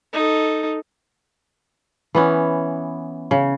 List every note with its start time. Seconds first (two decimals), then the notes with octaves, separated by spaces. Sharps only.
0.13 D#4 A4
2.15 E3 B3 C#4
3.31 C#3